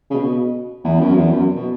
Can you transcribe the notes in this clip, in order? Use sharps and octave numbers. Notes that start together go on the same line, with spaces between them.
C#3
B2
E2
F#2
E2
F#2
B2